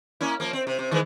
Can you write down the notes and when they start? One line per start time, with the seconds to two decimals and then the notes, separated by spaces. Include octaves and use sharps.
0.21 A#3 C#4 E4
0.40 F3 A#3
0.53 C4
0.67 C3
0.79 C3
0.91 D#3 E3 G#3